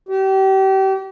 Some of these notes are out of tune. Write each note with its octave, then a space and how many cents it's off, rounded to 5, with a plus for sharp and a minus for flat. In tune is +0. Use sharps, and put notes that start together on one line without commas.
G4 -35